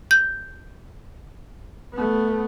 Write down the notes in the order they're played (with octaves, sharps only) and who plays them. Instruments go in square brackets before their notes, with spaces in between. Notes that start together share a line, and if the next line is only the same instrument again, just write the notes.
[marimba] G6
[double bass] A3 B3